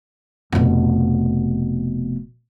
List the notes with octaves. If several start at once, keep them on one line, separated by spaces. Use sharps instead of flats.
F1 B2